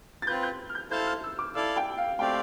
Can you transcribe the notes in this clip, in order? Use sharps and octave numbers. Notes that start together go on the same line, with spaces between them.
A6
C4 F4 B4 G6
G6
F6
G6
E4 A4 C5 F5 A5 G6
F6
E6
D6
E4 A4 D5 F5 E6
G5
F5
A3 C4 G4 D5 F5 G5